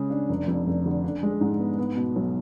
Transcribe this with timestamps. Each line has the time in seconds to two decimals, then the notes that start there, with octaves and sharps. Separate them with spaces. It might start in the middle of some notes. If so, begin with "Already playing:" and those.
Already playing: C#3 G#3 G#4
0.10 D4
0.29 F1
0.48 F2
0.67 F1
0.86 D3
1.04 D4
1.23 G#3
1.41 G#2
1.59 B3
1.78 B3
1.96 B2
2.16 B1